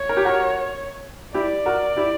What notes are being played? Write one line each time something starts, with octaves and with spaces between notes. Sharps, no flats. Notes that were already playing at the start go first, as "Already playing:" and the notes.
Already playing: C#5
A#4
G4
F#4 A#4
E4 G4 D5
F#4 A#4
E4 G4